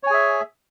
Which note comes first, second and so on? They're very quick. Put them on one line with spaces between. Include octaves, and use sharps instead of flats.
C#5 G#5 G#4 E5